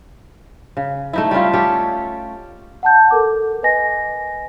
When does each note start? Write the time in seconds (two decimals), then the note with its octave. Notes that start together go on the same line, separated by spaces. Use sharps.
0.77 C#3
1.13 A3 D#4 E4
1.31 G3 A3 C#4 F4
1.53 C#4 G4 A4
2.83 F#5 A5 G6
3.11 A4 A#4 D6
3.63 B4 D#5 G#5 A#6